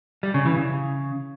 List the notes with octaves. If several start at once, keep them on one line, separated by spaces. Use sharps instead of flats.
G3
C#3
E3
C#3